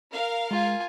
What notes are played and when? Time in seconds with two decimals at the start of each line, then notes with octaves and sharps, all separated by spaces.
0.13 A#4 F5
0.51 G#3 F4 G#5